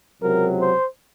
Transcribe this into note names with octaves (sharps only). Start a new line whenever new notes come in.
C#2 C3 F#3 A#4
C5